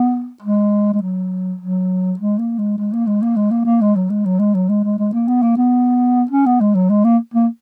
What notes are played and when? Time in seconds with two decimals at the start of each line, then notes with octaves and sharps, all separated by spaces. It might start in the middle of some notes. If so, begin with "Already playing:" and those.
Already playing: B3
0.42 G#3
0.94 G#3
1.02 F#3
1.61 F#3
2.19 G#3
2.39 A#3
2.59 G#3
2.78 G#3
2.93 A#3
3.07 G#3
3.22 A#3
3.36 G#3
3.51 A#3
3.65 A#3
3.81 G#3
3.96 F#3
4.10 G#3
4.26 F#3
4.39 G#3
4.55 F#3
4.69 G#3
4.84 G#3
4.99 G#3
5.13 A#3
5.28 B3
5.42 A#3
5.57 B3
6.31 C#4
6.46 B3
6.61 G#3
6.75 F#3
6.90 G#3
7.04 A#3
7.34 A#3